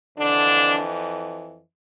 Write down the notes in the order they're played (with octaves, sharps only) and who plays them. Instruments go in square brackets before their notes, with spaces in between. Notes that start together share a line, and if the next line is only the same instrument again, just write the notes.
[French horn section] F2 D3 E3 D4